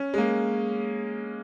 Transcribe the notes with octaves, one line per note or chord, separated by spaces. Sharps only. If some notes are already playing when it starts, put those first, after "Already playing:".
Already playing: C#4
G#3
A#3